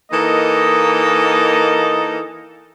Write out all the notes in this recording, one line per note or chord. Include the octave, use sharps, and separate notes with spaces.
E3 A#3 D#4 A4 A#4 D#5